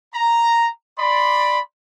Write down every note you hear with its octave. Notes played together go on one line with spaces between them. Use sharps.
A#5
D5 B5 C6